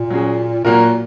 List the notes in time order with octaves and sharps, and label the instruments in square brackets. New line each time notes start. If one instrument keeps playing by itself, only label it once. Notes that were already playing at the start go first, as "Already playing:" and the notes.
Already playing: [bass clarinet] A#2
[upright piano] F#3 C#4 G#4
[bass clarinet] A#2 [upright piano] F#3 A#3 F#4 A#4